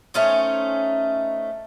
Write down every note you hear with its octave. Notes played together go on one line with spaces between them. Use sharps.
A3 C#4 D#4 C5